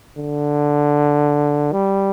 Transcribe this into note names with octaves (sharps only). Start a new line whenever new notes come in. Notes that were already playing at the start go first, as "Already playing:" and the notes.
D3
G3